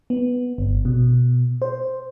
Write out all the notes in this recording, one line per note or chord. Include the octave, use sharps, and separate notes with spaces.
B3
G1
B2
C5